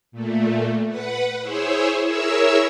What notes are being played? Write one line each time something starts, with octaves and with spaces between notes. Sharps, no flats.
A#2 A3
B4 F#5
E4 G#4 C5 C#5 E5
E4 G#4 A#4 C#5 E5 E6